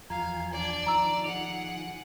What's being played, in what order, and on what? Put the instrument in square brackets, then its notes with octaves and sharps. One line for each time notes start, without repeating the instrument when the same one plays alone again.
[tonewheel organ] E2 F3 G#5 [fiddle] F5 [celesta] A#5
[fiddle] D4 D5
[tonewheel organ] D#3 F3 [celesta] A#5 E6
[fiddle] G#4 F#5 [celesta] D7 F7